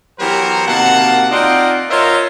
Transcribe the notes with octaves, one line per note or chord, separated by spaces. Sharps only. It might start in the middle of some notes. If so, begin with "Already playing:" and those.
E3 F#3 B3 G4 A#4 C5
C3 D#3 A#3 F#4 F#5 A5
C4 D#4 F4 D5 D#5 F#5
F4 A#4 C5 C#5 D#5 E5